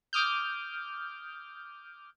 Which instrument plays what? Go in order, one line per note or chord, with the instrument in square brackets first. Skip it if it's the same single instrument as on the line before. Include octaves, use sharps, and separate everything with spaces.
[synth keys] D6 D#6 F6 G6